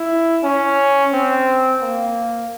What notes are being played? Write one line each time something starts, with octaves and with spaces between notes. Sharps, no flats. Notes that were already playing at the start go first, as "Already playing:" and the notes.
Already playing: E4
C#4
C4
A#3